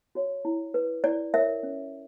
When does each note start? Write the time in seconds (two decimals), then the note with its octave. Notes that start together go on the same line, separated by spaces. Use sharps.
0.15 F#4 C#5
0.45 E4
0.74 B4
1.04 E4 D5
1.34 A#4 C#5 E5
1.63 C#4